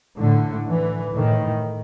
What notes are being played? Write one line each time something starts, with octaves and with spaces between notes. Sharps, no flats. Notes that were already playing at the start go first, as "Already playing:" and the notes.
A2 D3
E3
A2 D#3